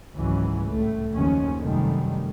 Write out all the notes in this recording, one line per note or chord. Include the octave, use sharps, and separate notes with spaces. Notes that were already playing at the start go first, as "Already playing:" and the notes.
G#1 C#2 G#2 E3 F#3 C#4
C2 A2 A3
F#1 D#2 D#3 F3 C#4
F1 F#2 C3 D#3 G3 A3